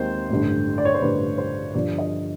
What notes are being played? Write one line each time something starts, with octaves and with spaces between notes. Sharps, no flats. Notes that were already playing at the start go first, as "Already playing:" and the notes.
Already playing: D#2 D#3 G#3 C4 C5
A1 G2 D3
D5
C#5
C5
A1 G2 D3 B4
C5
G2 D3 F3 D5
D#5